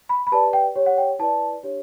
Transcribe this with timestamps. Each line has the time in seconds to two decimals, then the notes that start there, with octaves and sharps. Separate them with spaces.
0.09 B5
0.27 B5
0.32 G4 B4 D5 A5
0.53 G5
0.76 G4 C#5
0.86 F#5
0.98 G5
1.19 E4 B4 D5 A5
1.63 D4 G4 C#5